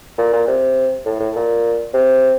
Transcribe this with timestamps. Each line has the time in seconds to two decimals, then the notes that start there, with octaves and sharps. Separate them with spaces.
0.18 A#2
0.33 A#2
0.48 C3
1.06 A2
1.20 A2
1.35 A#2
1.94 C3